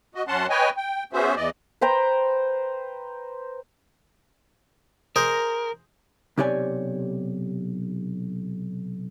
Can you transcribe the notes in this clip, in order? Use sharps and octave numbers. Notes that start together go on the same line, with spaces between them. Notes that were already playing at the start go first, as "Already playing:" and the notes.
F#4 D#5
F#2 C#4 F#5 A5 C6
B4 C#5 D#5 G5 G#5
G5
B3 C#4 F#4 G#4 C5 E5
E2 E3 D5 D#5
B4 C5 G5 A#5
G#4 A#4 C5 D#5
B1 C3 G4 C#5 D5 G#5